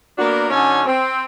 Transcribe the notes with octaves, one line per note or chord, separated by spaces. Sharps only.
A#3 B3 D4 F#4 A#4
F#2 D3 C#4 D#4 A4 G#5
C4